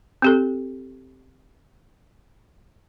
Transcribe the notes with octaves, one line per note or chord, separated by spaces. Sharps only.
C4 G4 A4